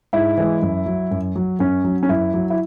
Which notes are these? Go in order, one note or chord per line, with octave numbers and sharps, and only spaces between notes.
G#2 E4
E3 G#3
F#2
F#3
F#2
F#3
F#2 C#4
F#3
C#4
F#2 E4
F#3
E4